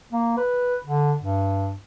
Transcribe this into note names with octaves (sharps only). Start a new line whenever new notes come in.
A#3
B4
D3
G2